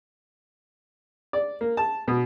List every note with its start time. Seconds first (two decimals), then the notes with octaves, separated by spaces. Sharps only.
1.33 D5
1.61 A#3
1.77 A5
2.08 B2